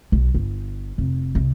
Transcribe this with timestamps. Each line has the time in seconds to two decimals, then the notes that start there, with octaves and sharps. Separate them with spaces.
0.12 B1
0.35 G1
0.98 F1
1.35 C2